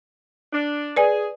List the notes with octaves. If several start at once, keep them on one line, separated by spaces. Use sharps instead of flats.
D4
G#4 B4 D5 G#5